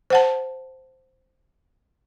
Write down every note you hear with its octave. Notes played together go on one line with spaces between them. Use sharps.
C5 F#5 A5